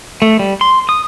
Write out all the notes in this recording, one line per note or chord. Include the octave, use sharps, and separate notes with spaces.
A3
G3
C6
D#6